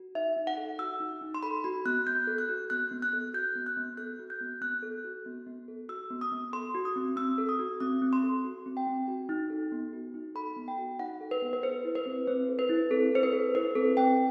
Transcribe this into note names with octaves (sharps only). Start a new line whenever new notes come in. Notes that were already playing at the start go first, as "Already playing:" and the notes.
Already playing: F#4
D#4 E5
D#4
F#5
A4
F#4 E6
D#4
D#4
C6
A4 B5
F#4 B5
B3 F#6
B3 G6
A4
F#6
F#4
B3 F#6
B3
F#6
A4
F#4 G6
B3
F#6
B3
A4 F#6
F#4
G6
B3
B3 F#6
A4
F#4
B3
B3
A4
F#4 E6
B3
D#6
B3
A4 C6
F#4
D#6
C4
C4 E6
A4
D#6
F#4
C4 D#6
C4
C6
A4
F#4
C4
G5
C4
F#4
D#4
A4
B3
F#4
D#4
A4 B5
B3
G5
F#4
D#4 F#5
A4
B4
B3
B4
A4 C5
E4
B4
C4
C4 C5
A4
B4
E4
C4 A4
C4 C5
B4
A4
E4 B4
C4 A4
C4 G5